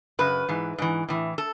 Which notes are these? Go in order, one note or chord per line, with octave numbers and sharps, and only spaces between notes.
F#2 C#3 B4
G#2 E3
G#2 E3
A2 E3
A4